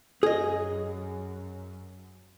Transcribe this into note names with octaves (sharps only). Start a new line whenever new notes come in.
F#2 G#4 D#5